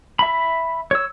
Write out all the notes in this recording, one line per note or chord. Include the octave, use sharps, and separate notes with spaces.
E5 B5
C#5 E6